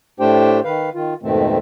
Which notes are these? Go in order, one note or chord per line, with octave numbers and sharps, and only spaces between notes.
A2 A3 D4 G4 C5 G5
D#3 B4 F5
D#3 F4
F2 G#2 B2 D#3 A3 C4